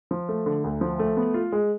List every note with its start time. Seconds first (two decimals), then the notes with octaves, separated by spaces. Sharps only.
0.11 F3
0.29 A3
0.46 D3
0.64 D2
0.81 F3
0.99 A3
1.17 B3
1.34 F4
1.52 G#3